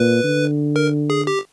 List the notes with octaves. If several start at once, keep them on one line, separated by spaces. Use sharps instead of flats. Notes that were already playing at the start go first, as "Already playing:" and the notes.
Already playing: A#2 B4
D3
A#4
G#4
G4